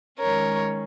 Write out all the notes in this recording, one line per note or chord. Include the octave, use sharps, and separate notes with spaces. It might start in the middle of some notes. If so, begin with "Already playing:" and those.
D#3 G#3 C#4 A#4 C#5